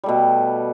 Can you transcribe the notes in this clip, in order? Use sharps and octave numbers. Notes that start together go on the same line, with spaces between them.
B2 G3 A3